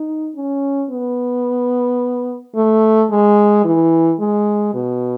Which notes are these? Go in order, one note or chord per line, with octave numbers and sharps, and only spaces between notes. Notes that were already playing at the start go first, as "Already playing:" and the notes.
Already playing: D#4
C#4
B3
A3
G#3
E3
G#3
B2